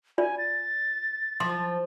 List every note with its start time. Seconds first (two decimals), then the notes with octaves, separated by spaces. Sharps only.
0.18 F4 D5 G#5
0.38 A6
1.40 F3 C6 D6